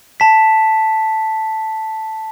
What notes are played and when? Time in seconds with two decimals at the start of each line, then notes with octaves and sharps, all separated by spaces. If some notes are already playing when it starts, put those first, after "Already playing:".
0.20 A5 B6